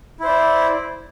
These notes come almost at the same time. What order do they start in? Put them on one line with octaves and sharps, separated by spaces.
E4 C5 D5